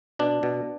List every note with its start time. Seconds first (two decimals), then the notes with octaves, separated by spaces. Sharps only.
0.19 B2 D4
0.43 B2